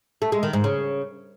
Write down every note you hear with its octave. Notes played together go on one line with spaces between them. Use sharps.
A3
G#3
D#3
G#2
C#3